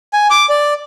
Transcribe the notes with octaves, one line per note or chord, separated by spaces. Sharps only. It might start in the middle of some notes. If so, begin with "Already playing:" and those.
G#5
D6
D5